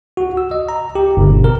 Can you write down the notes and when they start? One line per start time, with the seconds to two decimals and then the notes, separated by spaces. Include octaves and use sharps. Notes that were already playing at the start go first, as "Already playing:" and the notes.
0.17 F#4
0.37 E6
0.51 D#5
0.69 A#5
0.95 G4
1.17 G1
1.30 B2
1.44 A#4